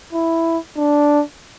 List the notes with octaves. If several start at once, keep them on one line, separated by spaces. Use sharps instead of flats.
E4
D4